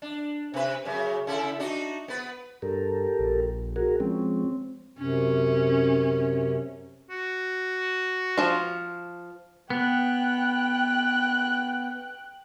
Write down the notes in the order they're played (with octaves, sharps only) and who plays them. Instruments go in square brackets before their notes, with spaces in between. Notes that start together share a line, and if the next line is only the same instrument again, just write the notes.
[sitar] D4
C3 B4
F#2 C#3
C#3 E4 A4
D4 D#4 F#4
B3 B4
[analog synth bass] G2 [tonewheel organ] G4 A4 A#4
[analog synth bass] A#1
[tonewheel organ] F#4 G#4 A#4
[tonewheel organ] F3 G#3 C#4 [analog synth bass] C4
[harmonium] F#2 C3 [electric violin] C#4
[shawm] F#4
[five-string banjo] F3 F4
[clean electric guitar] B3 [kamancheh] G5 F#6